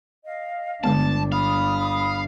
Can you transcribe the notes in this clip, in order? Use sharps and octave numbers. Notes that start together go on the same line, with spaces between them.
D#5 F5
G1 D3 G#3 B3 D4 A5
F5 B5 D#6